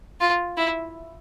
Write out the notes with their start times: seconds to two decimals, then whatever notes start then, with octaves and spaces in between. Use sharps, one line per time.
0.20 F4
0.57 E4